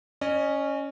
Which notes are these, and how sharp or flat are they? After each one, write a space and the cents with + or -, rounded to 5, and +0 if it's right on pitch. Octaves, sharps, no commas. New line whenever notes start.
C#4 +0 D#5 -40